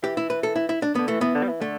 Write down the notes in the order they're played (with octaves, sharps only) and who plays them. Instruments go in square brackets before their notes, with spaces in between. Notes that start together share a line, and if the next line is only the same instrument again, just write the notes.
[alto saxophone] E3 [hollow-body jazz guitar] G4
[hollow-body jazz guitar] E4
B4
A4
E4
E4
D4
[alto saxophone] D3 [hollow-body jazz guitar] B3
[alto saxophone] E3 [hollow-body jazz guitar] A3
[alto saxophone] E3 [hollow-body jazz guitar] B3
[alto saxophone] D3
G3
E3
[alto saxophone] D3 [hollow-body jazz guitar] A3